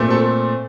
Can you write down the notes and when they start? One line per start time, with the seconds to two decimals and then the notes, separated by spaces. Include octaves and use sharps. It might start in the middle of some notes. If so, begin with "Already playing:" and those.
Already playing: A#2 A3 C4
0.10 A4